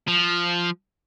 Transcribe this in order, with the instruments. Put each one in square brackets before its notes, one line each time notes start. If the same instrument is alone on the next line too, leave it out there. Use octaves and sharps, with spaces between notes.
[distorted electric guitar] F3